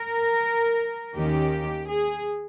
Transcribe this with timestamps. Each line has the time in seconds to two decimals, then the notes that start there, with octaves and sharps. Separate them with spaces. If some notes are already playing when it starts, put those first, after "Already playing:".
Already playing: A#4
1.15 D#2 D#3 A#3 C#4 G4
1.86 G#4